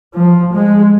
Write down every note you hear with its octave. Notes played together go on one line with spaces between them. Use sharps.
F3
G#3